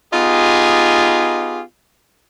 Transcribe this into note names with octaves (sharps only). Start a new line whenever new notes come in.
B3 D#4 F4 G4 G#4